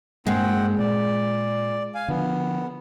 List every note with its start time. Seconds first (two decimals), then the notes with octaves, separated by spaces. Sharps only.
0.27 G2 G#3 A#3 C4 F#5 G5
0.79 A#2 D5
1.95 F5 G#5
2.08 D3 F3 B3